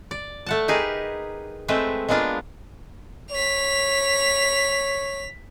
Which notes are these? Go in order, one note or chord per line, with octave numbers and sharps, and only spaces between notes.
D5
A3 F#5 A5
D#4 G4 G#4 A#4 B4
G#3 A3 C4 B4 E5 G5
G#3 A#3 B3 D4 F4
C#5 B6 F7